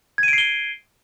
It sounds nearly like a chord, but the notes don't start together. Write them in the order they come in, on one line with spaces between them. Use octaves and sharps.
G#6 D#7 D7 C7 G7